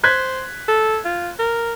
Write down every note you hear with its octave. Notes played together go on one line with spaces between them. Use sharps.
C5 F#6 G#6 B6
A4
F4
A#4